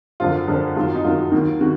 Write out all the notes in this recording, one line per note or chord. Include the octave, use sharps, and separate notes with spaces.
F#2 D3 F3 F4
F#2 D3 F3
F#2 D#3 F#3 F4
D#4
F#2 D#3 F#3 F4
D#2 D#3 F#3
D#3 F#4